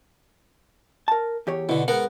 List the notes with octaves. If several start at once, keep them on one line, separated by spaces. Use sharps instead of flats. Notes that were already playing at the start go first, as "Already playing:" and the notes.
A#4 A5
E2 G4 C#5
B2 D3 E4
G#2 B3 A#4 F#5